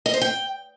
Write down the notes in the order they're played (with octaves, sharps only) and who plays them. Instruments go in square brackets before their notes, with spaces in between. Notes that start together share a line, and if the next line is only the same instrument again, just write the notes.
[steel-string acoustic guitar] D#5
C5
G5